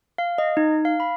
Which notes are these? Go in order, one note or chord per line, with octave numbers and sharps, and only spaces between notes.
F5
D#5
D#4
F5
B5